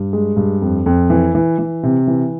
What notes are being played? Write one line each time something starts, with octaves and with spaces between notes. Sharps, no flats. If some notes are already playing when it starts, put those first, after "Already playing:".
Already playing: G2
G#3
G2
F2
F2
E3
E3
E3
C3
E3